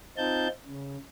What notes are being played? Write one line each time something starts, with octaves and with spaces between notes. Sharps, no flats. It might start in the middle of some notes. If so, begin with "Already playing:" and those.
C4 D#4 F4 A5 G6
C#3